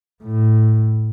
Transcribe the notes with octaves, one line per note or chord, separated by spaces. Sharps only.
A2